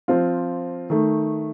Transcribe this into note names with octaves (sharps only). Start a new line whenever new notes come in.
F3 C4 F4
D#3 A3